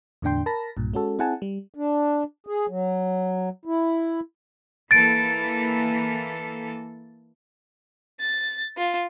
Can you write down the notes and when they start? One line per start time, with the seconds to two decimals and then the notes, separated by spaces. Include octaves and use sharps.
0.22 E2 A2 D3 D4 G5 C6
0.46 A#4 A5 B5 A#6
0.77 B1 G2 A#2
0.93 G#3 C#4 F#4 A4
1.19 C4 E4 G#4 F#5 G#5 A5
1.42 G3
1.74 D4
2.47 G#4
2.68 F#3
3.66 E4
4.91 E3 A#3 A4 A6 D7
8.20 A6
8.78 F4